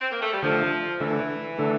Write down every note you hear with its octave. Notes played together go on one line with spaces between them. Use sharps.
C4
A#3
A3
G3
D3 F3 A3 D4 A4
D3 E3 A3 D4 A4
D3 A3 D4 A4